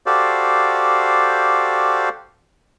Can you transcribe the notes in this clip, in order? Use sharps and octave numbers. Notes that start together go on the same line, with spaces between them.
F#4 G4 A4 C5 D5 F5